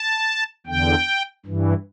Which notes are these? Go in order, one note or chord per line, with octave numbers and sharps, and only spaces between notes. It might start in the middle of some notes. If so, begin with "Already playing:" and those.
Already playing: A5
E2 D3 G5
G2 E3